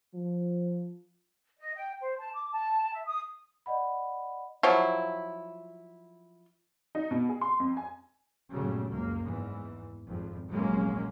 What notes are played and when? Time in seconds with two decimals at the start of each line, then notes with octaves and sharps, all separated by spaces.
0.15 F3
1.57 D#5
1.76 G5
2.01 C5
2.19 A5
2.33 D6
2.51 A5
2.92 E5
3.05 D#6
3.66 D5 D#5 F#5 B5
4.63 F3 F#3 E4
6.95 D#4
7.11 B2
7.29 G#4
7.41 C6
7.60 F2
7.77 G#5
8.52 G1 A#2 C#3 F#3 G3 A3
8.91 F#1 C#2 A#3
9.23 E2 G#2 E3
10.07 G#1 F2
10.50 F1 A#1 F#3 G#3 A#3 C#4